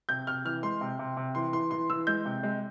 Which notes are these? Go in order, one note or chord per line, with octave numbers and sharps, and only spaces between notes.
C3 G6
C3 F6
E3 F6
G#3 C6
C3
C3
C3
E3 C6
E3 C6
E3 C6
E3 E6
G#3 G6
C3
G#3